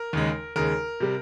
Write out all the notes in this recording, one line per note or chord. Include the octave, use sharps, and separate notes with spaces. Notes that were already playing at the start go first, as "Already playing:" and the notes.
Already playing: A#4
D#2 C#3 G#3
D#2 C#3 G#3 A#4
C3 G3